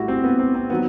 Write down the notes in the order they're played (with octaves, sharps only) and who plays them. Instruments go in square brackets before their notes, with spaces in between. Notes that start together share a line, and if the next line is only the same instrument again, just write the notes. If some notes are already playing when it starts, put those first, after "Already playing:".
Already playing: [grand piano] A2 G3 E4 F#4 G4
C4
B3
C4
C4
D#3 F#3 B3